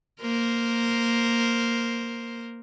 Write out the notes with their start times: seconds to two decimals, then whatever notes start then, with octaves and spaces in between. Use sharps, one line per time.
0.21 A#3 A#4 C5